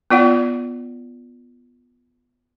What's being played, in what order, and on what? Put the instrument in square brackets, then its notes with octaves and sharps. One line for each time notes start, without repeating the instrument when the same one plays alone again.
[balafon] B3 F4 D5 F#5